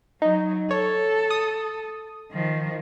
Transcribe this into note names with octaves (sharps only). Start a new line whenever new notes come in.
F#3 D#4
A4 C#5
D#6
D#3 F3